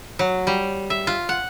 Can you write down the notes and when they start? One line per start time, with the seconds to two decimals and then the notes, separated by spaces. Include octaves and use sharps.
0.19 F#3
0.47 G3
0.90 E5
1.07 F4
1.29 F#5